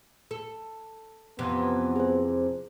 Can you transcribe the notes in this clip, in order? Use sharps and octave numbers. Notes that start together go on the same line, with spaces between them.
A4
F2 C3 E3 B3
G#4 C5